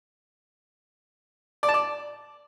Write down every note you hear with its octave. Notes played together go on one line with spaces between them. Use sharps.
D5
A5
D5